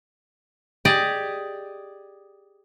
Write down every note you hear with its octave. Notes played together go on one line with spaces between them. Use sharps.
G4 G#4 D5 D#5